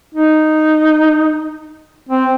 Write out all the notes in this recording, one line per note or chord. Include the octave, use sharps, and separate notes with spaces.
D#4
C4